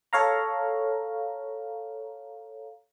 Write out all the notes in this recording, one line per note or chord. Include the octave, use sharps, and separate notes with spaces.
A4 C#5 F5 A#5